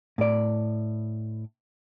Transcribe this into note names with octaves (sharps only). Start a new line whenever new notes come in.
A2 D5